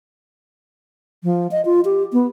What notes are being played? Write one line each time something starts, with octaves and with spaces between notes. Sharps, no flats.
F3
D#5
F4
G4
B3